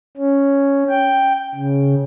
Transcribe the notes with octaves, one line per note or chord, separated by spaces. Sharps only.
C#4
G5
C#3